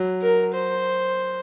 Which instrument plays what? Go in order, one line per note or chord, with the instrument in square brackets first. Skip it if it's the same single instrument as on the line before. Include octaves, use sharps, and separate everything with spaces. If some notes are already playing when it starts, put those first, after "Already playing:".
Already playing: [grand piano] F#3
[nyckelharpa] A#4
C5